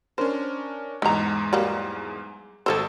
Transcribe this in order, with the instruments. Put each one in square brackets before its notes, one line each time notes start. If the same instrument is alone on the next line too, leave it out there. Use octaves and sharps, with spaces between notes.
[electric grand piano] C#4 D4 A#4 [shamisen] C5
[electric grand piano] E2 G#2 G#3 [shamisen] D#3 A#5
[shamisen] F#3 G3 A#3
[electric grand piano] G#1 E6 [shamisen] A4 A#4 C5